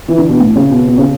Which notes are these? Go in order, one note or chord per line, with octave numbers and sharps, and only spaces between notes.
E3
D3
B2
A2
C#3
B2
B2
C#3